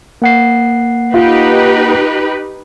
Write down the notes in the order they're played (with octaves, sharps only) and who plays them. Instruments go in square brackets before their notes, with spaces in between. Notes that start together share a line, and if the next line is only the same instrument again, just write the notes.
[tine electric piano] A#3 F#5 C7
[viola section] D#4 G4 B4 [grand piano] F4